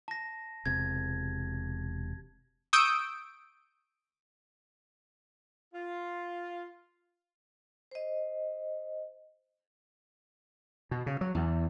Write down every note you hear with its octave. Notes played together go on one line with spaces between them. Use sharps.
A5 A#6
E1 C3 G#6
C#6 D#6 E6 G6 D7
F4
C5 D#5
B2
C#3
F#3
E2